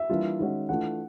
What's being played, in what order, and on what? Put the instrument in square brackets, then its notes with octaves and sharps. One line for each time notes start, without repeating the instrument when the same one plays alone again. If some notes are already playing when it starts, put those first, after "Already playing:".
Already playing: [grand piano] E5
[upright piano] E3 G3 A#3 D4 F4
D#3 G#3 C#4 F#4
[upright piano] E3 A3 D4 F4 [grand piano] F#5